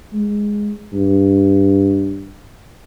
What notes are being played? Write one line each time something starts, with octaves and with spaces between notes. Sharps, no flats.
G#3
G2